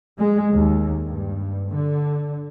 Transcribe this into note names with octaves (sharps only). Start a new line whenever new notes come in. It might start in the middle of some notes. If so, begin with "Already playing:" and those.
G#3
D#2
G2
D3